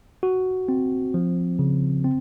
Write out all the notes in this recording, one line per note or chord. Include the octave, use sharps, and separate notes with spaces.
F#4
C4
F3
C#3
C4